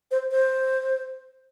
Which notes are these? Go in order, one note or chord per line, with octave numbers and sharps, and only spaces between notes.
C5
C5